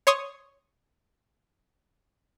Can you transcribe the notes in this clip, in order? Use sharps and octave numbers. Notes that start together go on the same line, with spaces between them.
C#5 C6 C#6 D#6